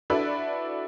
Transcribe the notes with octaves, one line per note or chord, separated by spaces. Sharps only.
D4 E4 F#4 A4 B4 D5